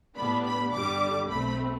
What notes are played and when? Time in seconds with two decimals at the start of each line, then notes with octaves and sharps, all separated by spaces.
0.17 A2 G3 B3 D4 B5
0.45 B5
0.74 G2 D3 G3 D4 D6
1.31 B1 B2 A3 C4 B5